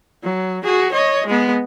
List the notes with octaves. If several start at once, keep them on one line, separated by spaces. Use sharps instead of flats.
F#3
F#4 G#4
C#5 D#5
G#3 B3